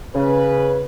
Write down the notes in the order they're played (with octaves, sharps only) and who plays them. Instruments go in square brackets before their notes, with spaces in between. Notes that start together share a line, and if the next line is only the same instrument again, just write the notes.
[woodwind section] C#3 [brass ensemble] B4